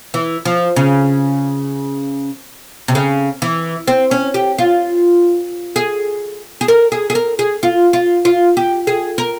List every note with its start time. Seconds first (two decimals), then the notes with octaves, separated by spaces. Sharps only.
0.14 E3
0.45 F3
0.76 C#3
2.88 C3
2.95 C#3
3.42 E3
3.87 C4
4.11 C#4
4.34 G4
4.58 F4
5.76 G#4
6.61 G#4
6.68 A#4
6.92 G#4
7.10 G#4
7.15 A#4
7.39 G#4
7.63 F4
7.93 F4
8.25 F4
8.57 G4
8.87 G#4
9.18 A#4